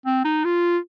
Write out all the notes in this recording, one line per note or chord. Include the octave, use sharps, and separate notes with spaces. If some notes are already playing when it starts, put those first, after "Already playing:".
C4
D#4
F4